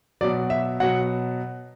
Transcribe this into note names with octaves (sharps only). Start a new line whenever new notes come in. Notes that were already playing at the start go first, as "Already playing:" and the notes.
B2 F#3 D5
E5
B2 F#3 F#5